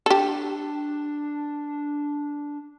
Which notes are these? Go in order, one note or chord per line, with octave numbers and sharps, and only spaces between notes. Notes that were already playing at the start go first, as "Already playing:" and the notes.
D4 G4 A4